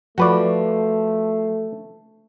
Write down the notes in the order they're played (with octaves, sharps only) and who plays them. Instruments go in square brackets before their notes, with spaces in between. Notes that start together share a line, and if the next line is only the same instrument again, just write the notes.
[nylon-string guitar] F3 [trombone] A3 [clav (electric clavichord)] F#4 B4 D5